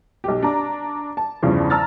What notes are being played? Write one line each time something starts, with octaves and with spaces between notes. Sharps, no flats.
B1 G4
D4 A#5
A5
E2 G2 C#3 E3 F3
A5 A#5 E6 F6 A6